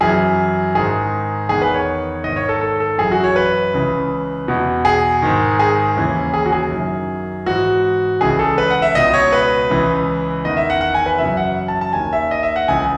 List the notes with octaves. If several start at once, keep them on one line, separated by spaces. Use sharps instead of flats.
F#2 E3 G#4
G#2 D#3 G#4
E2 D#3 G#4
B4
C#5
G#2 D#3 D#5
C#5
A4
A4
A4
F#2 E3 G#4
F#4
C#5
B4
C#2 C#3 E3
E2 B2
G#4
G#2 D#3
G#4
D#2 C#3 E3
G#4
F#4
G#4
F#2 D#3
G#2 E3 F#4
C#2 C#3 E3 G#4
A4
B4
F#5
E5
C#2 B2 D#5
C#5
B4
C#2 C#3 E3
E2 D#3 D#5
E5
F#5
F#5
G#5
B4
F#2 C#3 E3 E5
F#5
A5
A5
D#2 D#3 G#5
E5
D#5
E5
F#5
C#2 C#3 E3 G#5